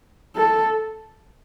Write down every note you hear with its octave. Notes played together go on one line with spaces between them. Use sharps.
A4